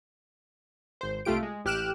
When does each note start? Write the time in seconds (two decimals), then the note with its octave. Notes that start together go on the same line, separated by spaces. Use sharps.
1.01 G#1 C5
1.25 C2 A3 F4 G4 D7
1.43 G#3
1.65 A1 G4 F6 F#6 D7 E7